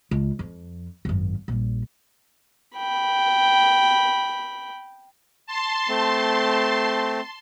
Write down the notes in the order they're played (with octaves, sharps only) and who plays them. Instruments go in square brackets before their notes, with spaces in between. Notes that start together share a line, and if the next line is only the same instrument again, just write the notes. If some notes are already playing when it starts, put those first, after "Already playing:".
[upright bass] C#2
F2
G#1 F#2
A#1 G3
[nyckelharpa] G5 B5
[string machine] A5 C6
[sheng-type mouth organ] A3 C4